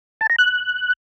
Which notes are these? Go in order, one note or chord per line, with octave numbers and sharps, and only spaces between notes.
A5
A#5
F#6